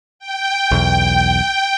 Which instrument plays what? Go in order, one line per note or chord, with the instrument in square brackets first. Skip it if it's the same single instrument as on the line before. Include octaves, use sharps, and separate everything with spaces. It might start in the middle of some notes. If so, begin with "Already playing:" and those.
[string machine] G5
[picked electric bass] B1 E2